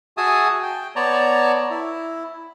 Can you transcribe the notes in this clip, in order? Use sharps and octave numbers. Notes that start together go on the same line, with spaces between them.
F#4 G#4 E5 G#5 A5 D#6
G5
B3 C#5 D5 A5 A#5
E4